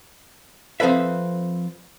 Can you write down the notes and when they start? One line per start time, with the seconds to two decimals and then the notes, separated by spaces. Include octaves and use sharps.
0.80 F3 C4 A4 B4 E5